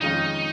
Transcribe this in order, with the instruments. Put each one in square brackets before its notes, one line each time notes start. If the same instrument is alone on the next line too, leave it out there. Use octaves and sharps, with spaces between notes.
[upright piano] F2 D#3 G#3 C#4 F4 [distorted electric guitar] D#4